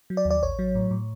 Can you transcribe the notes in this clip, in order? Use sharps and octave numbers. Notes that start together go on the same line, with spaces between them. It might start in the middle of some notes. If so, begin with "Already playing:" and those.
F#3
D5
D#2
D5
A1 C#5
F#3
A2
A2